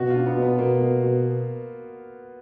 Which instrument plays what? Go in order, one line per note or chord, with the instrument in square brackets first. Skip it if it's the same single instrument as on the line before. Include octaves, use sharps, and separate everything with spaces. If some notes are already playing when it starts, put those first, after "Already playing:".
Already playing: [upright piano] B2 [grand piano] F#4
[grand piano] F4
[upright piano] D4
[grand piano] B3
[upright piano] B2
[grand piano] B3
[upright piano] B2 [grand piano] A#3
[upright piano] B2
B2